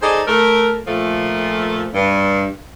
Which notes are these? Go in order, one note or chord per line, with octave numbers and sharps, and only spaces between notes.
D#4 G#4 A4 C5 D5 D#5
A3 A4 A#4
A#2 F3 A3
G2